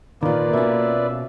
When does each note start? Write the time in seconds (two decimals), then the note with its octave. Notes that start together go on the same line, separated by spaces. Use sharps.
0.23 A#2 D#3 A#3 F4 B4 D5
0.53 B2 C#4 E5